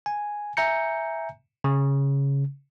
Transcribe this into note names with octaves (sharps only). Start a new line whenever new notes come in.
G#5
E5 G#5 A#5 G6 C#7
C#3